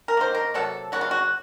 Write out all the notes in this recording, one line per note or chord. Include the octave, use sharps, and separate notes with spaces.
A#4
D#3 A#3 C5
A#4
C3 F#3 A#3 A4
C#3 F#3 A#3 F#4
F4
F#4